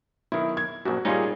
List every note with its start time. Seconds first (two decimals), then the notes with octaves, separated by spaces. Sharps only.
0.32 B1 D#3 E4
0.57 G#6
0.85 A#1 F#2 F#4
1.05 A#2 G3 C#4 D#4 F4 G#4